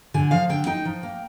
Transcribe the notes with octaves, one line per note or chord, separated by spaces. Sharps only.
D3 G#5
F3 F5
D3 G5
D#4 G5
F3
A#3